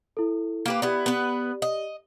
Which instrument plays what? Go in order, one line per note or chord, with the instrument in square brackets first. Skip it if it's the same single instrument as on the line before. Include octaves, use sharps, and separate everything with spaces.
[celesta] E4 A4
[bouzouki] A#3 G4 B4
[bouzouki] B3 E4 [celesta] G4 D5
[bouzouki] B3 B4
D#5